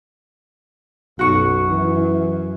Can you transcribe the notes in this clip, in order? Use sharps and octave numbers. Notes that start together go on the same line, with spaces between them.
B1 F#2 F#4 C#6
E3